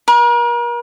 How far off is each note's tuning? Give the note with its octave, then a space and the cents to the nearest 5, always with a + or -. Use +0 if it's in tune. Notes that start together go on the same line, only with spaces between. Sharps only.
A#4 +40